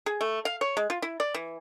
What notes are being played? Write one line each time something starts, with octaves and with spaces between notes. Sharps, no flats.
G#4
A3
F5
C#5
G#3
F4
E4
D5
E3